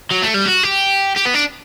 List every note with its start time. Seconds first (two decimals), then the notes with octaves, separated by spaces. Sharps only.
0.11 F#3
0.22 A3
0.34 G3
0.46 F#4
0.63 G4
1.16 G4
1.25 B3
1.34 D4